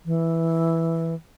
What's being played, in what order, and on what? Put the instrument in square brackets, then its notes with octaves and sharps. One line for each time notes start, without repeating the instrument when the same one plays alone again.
[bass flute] E3